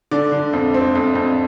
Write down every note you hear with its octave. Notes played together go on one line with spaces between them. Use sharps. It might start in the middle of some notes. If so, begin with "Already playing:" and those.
D3 D5
D3
F2
C4
F2
F2